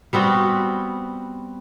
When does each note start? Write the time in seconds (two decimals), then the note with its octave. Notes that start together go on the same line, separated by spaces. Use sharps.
0.13 G3 B3 C4 F#4